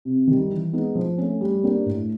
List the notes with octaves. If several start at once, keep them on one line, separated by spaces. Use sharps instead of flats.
C3
D#3 G3
E3
G#3 B3 D#4
F3
A3 C#4
G3
A#3 D4 G4
A2